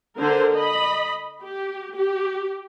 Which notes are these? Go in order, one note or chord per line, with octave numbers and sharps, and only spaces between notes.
D3 A#4 C5
D#5 B5
G4
G4